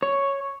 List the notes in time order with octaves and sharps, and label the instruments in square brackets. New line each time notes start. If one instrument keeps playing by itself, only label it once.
[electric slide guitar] C#5